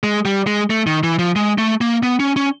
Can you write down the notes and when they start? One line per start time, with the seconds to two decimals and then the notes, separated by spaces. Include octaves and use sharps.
0.03 G#3
0.25 G3
0.47 G#3
0.70 A3
0.87 D#3
1.03 E3
1.19 F3
1.36 G#3
1.58 A3
1.81 A#3
2.03 B3
2.20 C#4
2.36 C#4